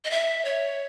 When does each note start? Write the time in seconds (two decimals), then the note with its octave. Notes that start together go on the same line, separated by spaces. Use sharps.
0.05 D#5
0.11 E5
0.45 C#5